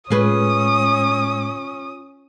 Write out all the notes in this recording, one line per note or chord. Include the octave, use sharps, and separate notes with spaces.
A2 G#3 C#4 F4 G#4 B4 D#6